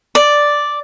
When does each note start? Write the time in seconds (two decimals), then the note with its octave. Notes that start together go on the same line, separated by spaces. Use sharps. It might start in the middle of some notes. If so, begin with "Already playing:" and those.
0.15 D5